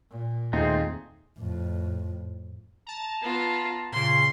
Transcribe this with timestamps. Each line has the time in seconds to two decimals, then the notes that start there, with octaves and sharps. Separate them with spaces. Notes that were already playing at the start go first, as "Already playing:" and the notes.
0.10 A#2
0.53 D#2 A3 C4 D#4 F4 G#4
1.39 F2 A2
2.87 A5 A#5
3.22 B3 F4
3.92 A#2 C#3 C6